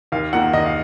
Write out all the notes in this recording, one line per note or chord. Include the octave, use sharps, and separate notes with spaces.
D#2 F5
D#3 A#3 F4 F#5
D#2 D#5
F5